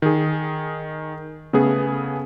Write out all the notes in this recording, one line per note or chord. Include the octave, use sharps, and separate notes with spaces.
D#3 G#4
C#3 A3 B3 G#4